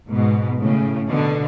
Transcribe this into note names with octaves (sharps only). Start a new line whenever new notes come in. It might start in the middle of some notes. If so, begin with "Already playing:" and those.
G#2 B2
A2 C#3
B2 D3